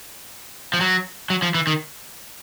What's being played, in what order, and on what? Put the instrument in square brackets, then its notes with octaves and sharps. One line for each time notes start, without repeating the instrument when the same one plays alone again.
[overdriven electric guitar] F3
F#3
F#3
F3
E3
D#3